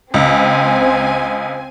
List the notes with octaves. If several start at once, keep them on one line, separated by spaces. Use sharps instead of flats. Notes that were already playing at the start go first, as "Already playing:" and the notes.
C#2 C4 G#5